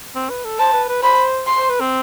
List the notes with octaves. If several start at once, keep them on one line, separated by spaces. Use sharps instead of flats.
C4
B4
A4
C5 A5
B4
B4
C5 B5
C6
C5
B4
C4